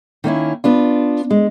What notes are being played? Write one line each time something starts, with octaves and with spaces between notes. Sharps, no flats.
D#3 A#3 C#4 E4
B3 D4 F4
G#3